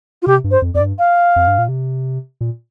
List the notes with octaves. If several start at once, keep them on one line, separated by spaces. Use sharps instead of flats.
F4
C3 G4
G2
C5
F2
F2 D5
G2
F5
F2
G2
A#2
C3
A#2